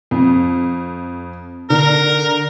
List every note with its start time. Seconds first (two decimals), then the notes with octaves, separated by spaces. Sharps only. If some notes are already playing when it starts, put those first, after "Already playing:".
0.11 F2
1.70 D3 A#4